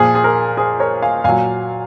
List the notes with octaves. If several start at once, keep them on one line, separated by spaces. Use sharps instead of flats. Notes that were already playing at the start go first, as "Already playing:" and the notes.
Already playing: A#2 F3 G#4
G#4
A#4
G#4 C5
A#4 C#5
F5 G#5
A#2 F#3 F5 G#5